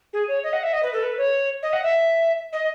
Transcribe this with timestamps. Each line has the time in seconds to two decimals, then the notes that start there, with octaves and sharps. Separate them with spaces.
0.13 G#4
0.28 C#5
0.44 D#5
0.53 F#5
0.63 E5
0.73 D#5
0.83 B4
0.93 A4
1.03 B4
1.18 C#5
1.63 D#5
1.73 F#5
1.83 E5
2.53 D#5